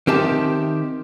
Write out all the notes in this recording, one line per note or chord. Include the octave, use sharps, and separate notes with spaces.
D#3 C4 G4 E5 A5